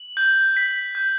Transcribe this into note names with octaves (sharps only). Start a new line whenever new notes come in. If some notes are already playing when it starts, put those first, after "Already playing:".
Already playing: F#7
G6
B6
G6